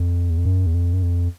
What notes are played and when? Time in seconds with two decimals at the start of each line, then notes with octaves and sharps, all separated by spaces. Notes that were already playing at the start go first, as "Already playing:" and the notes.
Already playing: F2
0.30 E2
0.38 F2
0.45 F#2
0.66 E2
0.74 F2
0.93 F#2
1.03 F2